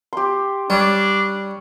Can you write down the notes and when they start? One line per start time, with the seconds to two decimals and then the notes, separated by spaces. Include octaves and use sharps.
0.13 G4 C6
0.70 G3 D4 C#5